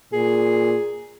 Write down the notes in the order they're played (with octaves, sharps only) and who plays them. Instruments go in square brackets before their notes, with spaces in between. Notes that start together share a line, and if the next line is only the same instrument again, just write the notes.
[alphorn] A#2 [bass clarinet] G#4